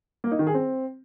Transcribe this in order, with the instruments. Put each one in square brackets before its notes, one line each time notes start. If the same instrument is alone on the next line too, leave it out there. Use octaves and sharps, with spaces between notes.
[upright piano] A#3
D#4
D#3
G#4
C4